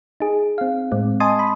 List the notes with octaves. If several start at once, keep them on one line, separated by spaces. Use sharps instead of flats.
D#4 G#4
C4 F5
A2 G#3 C4
D#5 G#5 A5 C6 D#6
B5